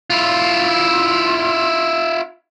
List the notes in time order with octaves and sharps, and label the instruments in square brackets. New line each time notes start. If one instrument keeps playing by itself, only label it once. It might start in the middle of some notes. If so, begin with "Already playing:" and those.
[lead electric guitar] E4 F4